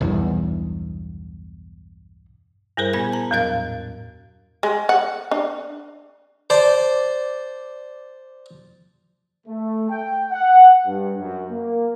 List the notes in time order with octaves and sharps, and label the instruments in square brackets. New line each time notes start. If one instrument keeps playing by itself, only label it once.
[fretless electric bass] B1 E2 G2
[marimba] G2 G3 G#4 A#4 C5
A#2 B3 G#5 G#6
A5 A#5
E2 A2 F#3 A#4 F5 A6
[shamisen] G#3
F#5
D4
[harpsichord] C5 D5 A5
[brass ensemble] A3
G5
F#5
G2
F#2
A#3